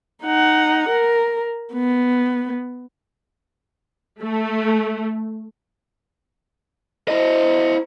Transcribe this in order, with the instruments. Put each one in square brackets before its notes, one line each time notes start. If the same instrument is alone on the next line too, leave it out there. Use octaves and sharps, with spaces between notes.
[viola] D#4 F#5
A#4
B3
[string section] A3
[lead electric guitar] E4 D#5 [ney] C5